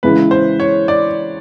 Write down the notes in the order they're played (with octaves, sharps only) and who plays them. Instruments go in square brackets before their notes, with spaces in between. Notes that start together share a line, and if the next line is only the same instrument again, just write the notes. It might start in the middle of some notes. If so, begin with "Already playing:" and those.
[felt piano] C#3 E3 G#3 [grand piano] B4
[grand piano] C5
C#5
D5